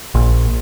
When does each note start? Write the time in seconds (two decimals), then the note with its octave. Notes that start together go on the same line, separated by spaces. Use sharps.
0.14 A#1